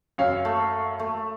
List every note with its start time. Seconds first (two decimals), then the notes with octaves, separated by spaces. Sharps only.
0.18 F#2 C#5 F5
0.45 A3
0.99 A3